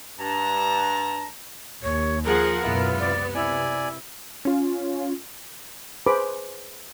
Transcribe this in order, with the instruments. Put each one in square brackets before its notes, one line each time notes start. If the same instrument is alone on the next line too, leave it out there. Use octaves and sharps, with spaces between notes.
[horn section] G2 A5 A#5
[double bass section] D#2 [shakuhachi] C#5
[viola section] F3 G#4 F#5 [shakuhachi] A#4
[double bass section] C#2 F#2 B2 [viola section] B3 [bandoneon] E4 F4
[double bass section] C3 [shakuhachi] D5
[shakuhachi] E4 [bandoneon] D5 G#5
[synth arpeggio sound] C#4 F4
[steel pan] G#4 B4 C5 B5 D6